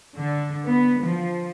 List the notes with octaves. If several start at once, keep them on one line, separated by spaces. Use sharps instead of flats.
D3
B3
F3